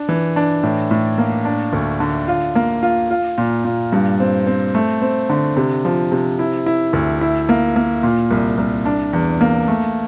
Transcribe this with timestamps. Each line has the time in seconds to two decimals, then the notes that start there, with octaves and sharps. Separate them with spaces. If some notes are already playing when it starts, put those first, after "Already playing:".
Already playing: D4
0.09 E3
0.36 D4
0.63 A2
0.91 A2
1.18 A#3
1.45 D4
1.73 D2
2.00 D3
2.28 F4
2.55 A#3
2.83 F4
3.10 F4
3.38 A#2
3.65 A#2
3.92 G2
4.20 C4
4.47 C4
4.75 A3
5.02 C4
5.29 D3
5.57 C3
5.85 F3
6.12 C3
6.39 E4
6.66 E4
6.93 D2
7.21 E4
7.49 A#3
7.76 A#3
8.03 A#2
8.31 C2
8.58 C2
8.85 D4
9.13 E2
9.41 A#3
9.68 A3